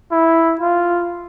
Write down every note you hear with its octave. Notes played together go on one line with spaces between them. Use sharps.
E4
F4